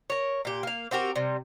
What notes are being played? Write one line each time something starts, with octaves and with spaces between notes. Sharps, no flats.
A#4 C#5
A#2 G4
A#3 F5
C4 F#4 G4 A#4
C3 G3